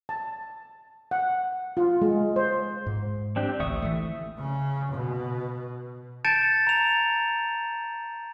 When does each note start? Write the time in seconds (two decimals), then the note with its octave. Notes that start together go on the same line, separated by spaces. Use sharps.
0.09 A5
1.11 F#5
1.77 F4
2.02 G#3
2.36 C5
2.86 G#2
3.36 C4 D4 G4
3.60 A1 D2 E5 C#6 D#6
3.82 E3 A3
4.38 C#3
4.93 B2
6.25 A5 G6 A6 C#7 D7 E7
6.67 A#5 F7